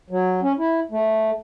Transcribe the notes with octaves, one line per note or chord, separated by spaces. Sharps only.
F#3
C#4
E4
A3